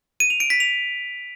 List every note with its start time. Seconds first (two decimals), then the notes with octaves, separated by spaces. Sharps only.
0.20 D#7
0.30 F7
0.40 D7
0.50 B6
0.60 F7